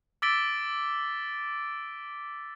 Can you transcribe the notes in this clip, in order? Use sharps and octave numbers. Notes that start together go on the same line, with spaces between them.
D6 E6 A6 B6 D7 G7